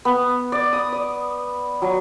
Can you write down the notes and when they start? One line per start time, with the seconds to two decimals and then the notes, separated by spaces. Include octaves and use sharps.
0.05 B3
0.52 D5
0.73 D#6
0.92 D5
1.82 F#3